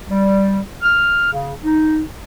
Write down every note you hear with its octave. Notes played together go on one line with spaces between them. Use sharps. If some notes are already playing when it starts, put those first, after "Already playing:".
G3
F6
C#3
D#4